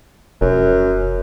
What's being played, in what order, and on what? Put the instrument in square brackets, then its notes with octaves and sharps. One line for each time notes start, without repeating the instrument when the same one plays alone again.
[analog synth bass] F1 [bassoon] F#2